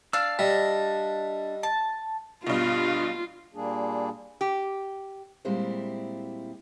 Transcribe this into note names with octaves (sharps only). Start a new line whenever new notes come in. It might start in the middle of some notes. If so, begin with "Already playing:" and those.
D4 F5 E6
G3 D#5 E5
A5
G2 B2 F4
A#2 G3 A#3 D4 G#4
G4
A#2 G3 G#3 C4 E4